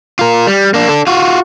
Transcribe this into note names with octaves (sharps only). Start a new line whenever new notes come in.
F4 A#4
G3
A#3 D4
D4 A4
F4 F#4